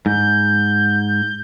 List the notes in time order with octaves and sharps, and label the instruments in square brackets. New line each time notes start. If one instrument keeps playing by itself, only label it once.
[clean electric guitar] G#2 [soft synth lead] G6